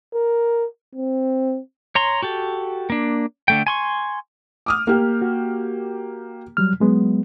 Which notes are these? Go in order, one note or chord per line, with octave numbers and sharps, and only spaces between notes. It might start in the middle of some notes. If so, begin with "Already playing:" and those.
A#4
C4
C#5 A#5 C6
F#4 G4 A4
A#3 D4
D3 A3 G5
G#5 C6 C#6
D6 D#6 F6
A#3 G4
F#4
F#3 G3 F6
F#3 G#3 B3